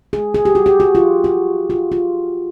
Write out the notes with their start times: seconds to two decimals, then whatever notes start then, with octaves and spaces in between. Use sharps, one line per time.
0.13 G#4
0.34 G#4
0.45 G4
0.55 F#4
0.66 G4
0.80 F#4
0.95 F4
1.24 F#4
1.70 F4
1.92 F4